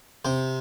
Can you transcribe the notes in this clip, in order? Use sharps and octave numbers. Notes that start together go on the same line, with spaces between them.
C3 C5